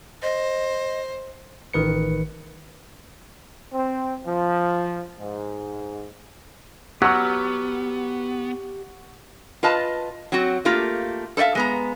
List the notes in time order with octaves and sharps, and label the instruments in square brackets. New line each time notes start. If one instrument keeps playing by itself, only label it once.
[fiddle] C5 [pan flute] D#5
[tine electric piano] A1 D#3 B4 C#7
[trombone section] C4
F3
G#2
[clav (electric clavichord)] F#3 [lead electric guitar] B3 [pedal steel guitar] G4 E6 F6 [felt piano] F#5 C#6
[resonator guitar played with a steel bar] F4 B4 D#5 A5
F#3 C4 F#4
A3 A#3 F4 G4
A4 C5 D5 E5 F5
G#3 B3 A#5